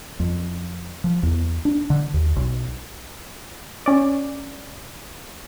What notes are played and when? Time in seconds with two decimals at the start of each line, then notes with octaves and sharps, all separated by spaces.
0.20 F2
1.04 F3
1.23 E2
1.65 D4
1.90 D3
2.14 D#2
2.36 B1
3.86 C#4 D5